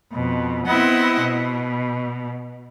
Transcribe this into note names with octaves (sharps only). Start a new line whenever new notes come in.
F2 B2
B3 C4 E4 D#5 F#5
B2